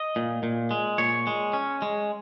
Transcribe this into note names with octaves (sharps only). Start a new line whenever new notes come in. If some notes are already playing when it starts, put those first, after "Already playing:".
Already playing: D#5
A#2
A#2
G#3
A#2 C#5
G#3
C#4
G#3